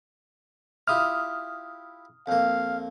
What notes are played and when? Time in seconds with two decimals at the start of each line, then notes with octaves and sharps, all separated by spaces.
0.88 E4 F4 G4 D#6 F6
2.27 F2 A#3 F5